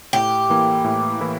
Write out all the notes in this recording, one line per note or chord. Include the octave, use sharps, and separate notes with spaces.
A2 G4
E3 A#3 E4
A2
E3 A#3 E4